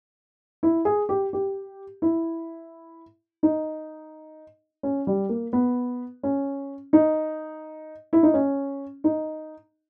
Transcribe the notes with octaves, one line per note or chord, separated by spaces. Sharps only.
E4
G#4
G4
G4
E4
D#4
C#4
G3
A#3
B3
C#4
D#4
E4
D#4
C#4
D#4